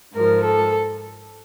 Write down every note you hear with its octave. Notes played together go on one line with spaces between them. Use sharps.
G#2 F3 A#4
A4